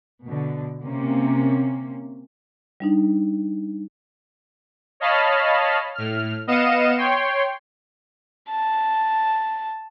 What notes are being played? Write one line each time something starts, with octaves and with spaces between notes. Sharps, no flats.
B2 D3
C3 A#3 C#4
G3 D4 D#4
C#5 D#5 F5 A5 B5 F6
A2 F6
B3 D#5 F5 C#7 D#7 E7
C#5 G5 C6
A5